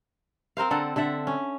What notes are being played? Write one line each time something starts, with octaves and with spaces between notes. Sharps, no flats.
C4 A#4 C5 F5
D3 C4 A4 F#5
D3 A4 E5 F#5
C#4